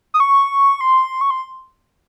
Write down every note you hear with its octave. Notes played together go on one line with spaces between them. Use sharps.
D#6
C#6
C6
C#6
C6